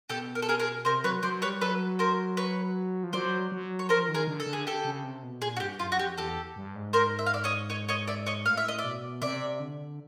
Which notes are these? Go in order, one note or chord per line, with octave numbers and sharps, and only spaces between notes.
B2 G4 A4
A#4
A4
G#4 A#4
G#4 A#4
C3 A#4 C5
F#3 B4 C#5
F#3 C5 D5
G3 B4 C#5
F#3 A4 B4
A#4 C5
B4 C#5
F3
F#3 C5 D5
F#3
C#5
F3 A#4 C5
D#3
G#4 A#4
D3
A4
D3
G#4
G4 A4
C#3
C3
B2
A#2 G#4
F#4
G2 G4
F#2 F4
F#4
F2 G4
E2 G4 A4
G2
G#2
A#4 C5
E5
F5
D5 E5
C#5 D#5
C#5 D#5
C#5 D#5
D5 E5
C#5 D#5
A2 F5
E5
D#5
D5 E5
B2
C3 D5 E5
D3